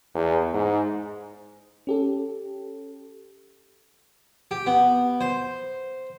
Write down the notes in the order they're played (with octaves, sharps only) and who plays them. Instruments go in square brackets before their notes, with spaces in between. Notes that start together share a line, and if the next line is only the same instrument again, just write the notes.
[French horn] E2
G#2
[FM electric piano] C#4 G4 A4
[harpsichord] G4
B3
C5